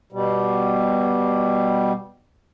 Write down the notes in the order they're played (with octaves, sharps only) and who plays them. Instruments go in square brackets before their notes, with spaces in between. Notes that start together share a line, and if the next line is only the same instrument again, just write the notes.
[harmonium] B2 G3